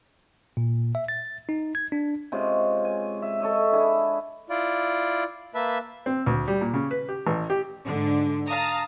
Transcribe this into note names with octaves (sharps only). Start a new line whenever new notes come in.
A#2
E5
A6
D#4
G#6
D4
C3 G#3 C#4 F4
G#5
E5
A4 C#5 D#5 E5
D4 E4 G#4
E4 F4 D5
A#3 B4 E5 A5
C4
D2
G3
A#2
C#3
B4
G4
A1
G4
G#2 D3
F5 A5 A#5 D#6